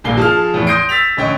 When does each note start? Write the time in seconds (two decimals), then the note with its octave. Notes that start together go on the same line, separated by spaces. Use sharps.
0.04 D#1 A#1 G2 A#3 C7 G7
0.17 F3 G#4 A5 F6
0.54 E2 A2 E3
0.67 C6 D#6 G6 A#6 C7 D7
0.89 E6 A6 B6 F7
1.17 A1 D2 C#4 D#5 G5